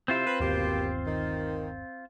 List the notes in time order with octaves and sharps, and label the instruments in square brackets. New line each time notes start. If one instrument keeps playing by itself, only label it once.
[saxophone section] C3 E4 [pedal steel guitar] C4 F4 C5
[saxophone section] B4
[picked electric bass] G1 D#2 [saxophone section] B2 A#3 G4
[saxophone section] D#3